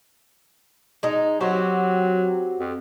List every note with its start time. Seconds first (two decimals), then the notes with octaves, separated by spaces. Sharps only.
1.03 G#3 D#4
1.40 F#3 C4 F#4 G4
2.59 F2